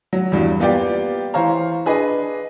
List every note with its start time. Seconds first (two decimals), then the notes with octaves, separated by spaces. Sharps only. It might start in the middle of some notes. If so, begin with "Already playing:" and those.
0.13 F#3
0.32 E2 G2
0.59 A#3 B3 F4 G4 D5 G5
1.34 E3 C5 C#5 F5 A#5
1.86 D4 G#4 B4 D#5